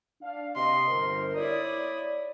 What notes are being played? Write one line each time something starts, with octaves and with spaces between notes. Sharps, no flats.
D4 F5
C3 G4 D#5 C6
G1 A#4 C5
E4 C#5 D5 D#6